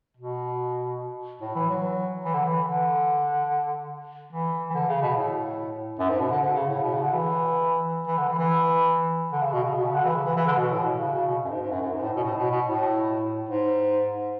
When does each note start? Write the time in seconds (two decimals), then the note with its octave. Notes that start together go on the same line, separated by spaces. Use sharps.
0.17 B2
1.41 A2
1.55 E3
1.70 F#3
2.25 E3
2.34 D3
2.43 E3
2.66 D3
4.33 E3
4.70 E3
4.74 D3
4.88 C#3
5.02 B2
5.16 A2
5.99 F#2
6.10 G#2
6.20 B2
6.31 D3
6.41 D3
6.55 C#3
6.69 A2
6.83 B2
6.93 C#3
7.03 D3
7.14 E3
8.07 E3
8.18 D3
8.28 E3
8.39 E3
9.32 D3
9.42 C#3
9.53 B2
9.64 C#3
9.74 B2
9.84 C#3
9.95 D3
10.05 E3
10.15 C#3
10.26 E3
10.36 E3
10.47 D3
10.57 B2
10.71 A2
10.85 B2
10.99 C#3
11.12 C#3
11.27 B2
11.45 F#2
11.50 G#2
11.61 G#2
11.71 F#2
11.82 F#2
11.93 G#2
12.03 A2
12.16 B2
12.23 A2
12.37 B2
12.51 B2
12.65 A2
13.49 G#2